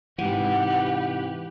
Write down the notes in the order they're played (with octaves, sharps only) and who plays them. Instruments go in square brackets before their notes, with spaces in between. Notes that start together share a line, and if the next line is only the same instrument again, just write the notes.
[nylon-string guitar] G#2 C3 [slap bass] E3 [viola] G4 B4 [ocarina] F#5